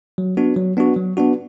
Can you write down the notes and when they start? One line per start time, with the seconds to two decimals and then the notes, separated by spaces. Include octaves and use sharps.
0.18 F#3
0.37 B3 D4 F#4
0.57 F#3
0.77 B3 D4 F#4
0.96 F#3
1.17 B3 D4 F#4